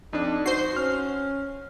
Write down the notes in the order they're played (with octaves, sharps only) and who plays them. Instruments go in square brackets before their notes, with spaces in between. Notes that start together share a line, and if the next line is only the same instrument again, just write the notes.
[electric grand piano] F2 D4 [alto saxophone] D#4
[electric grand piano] F#4 [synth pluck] C5 C7
[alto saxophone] C#4 [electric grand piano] F6